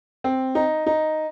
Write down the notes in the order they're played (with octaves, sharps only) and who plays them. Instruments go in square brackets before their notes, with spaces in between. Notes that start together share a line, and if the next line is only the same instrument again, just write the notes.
[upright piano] C4
D#4
D#4